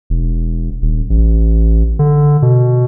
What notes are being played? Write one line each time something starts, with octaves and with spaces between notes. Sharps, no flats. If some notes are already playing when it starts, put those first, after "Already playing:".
E1
D#1
A1
D3
B2